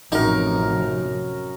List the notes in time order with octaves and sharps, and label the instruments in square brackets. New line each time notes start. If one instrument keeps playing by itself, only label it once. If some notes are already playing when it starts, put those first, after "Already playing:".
[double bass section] A1 C3 F3 [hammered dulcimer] F#2 A#4 [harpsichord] D#4